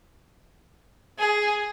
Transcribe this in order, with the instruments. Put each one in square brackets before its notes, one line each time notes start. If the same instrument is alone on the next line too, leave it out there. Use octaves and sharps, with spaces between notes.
[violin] G#4